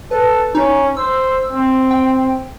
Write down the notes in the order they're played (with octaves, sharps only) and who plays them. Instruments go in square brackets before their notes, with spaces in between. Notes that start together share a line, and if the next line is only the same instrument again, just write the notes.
[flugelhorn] A4 [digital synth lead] B4
[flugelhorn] C#4 [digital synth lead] D#4
[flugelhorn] C5 [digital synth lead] E6
[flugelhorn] C4
[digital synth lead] G5